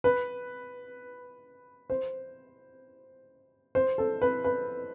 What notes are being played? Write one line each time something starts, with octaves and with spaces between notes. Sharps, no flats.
B4
C5
C5
A4
B4
B4